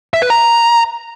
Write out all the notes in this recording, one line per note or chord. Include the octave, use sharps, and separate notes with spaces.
E5
B4
A#5